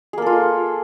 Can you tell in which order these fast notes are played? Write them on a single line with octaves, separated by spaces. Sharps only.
G#4 A#3 A4 F4